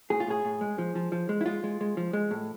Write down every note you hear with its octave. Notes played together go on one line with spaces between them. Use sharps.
A2 G#4
F4
A2 G#4
A2
G#3
F3
F3
F3
G#3
E4
G#3 F4
G#3
G#3
F3
G#3
A2